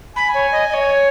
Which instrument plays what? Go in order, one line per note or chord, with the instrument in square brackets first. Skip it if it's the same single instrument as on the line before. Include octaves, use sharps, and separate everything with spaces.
[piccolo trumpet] G#5 [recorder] B5
[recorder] C#5
D#5
D#5
C#5